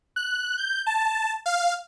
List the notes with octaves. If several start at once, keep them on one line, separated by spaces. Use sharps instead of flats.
F#6
G6
A5
F5